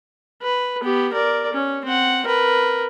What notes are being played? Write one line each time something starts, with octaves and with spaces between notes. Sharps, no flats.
B4
B3 G4
A#4 D5
C#4
C4 F#5
A#4 B4